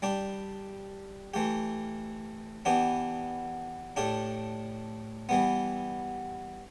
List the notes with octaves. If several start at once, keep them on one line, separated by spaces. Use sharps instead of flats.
G3 D4 G4
E3 A3 G4
E3 B3 D4 G4
A2 A3 D4 G4
E3 G3 B3